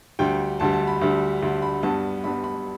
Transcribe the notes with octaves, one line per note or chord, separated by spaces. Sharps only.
D2 D3 G3 G5
D2 D3 G3 A5
A5
B5
D2 D3 G3
D2 D3 G3
B5
G2 G3 B3 A5
G2 G3 B3 B5
B5